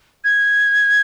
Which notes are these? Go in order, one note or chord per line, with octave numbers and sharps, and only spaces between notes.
G#6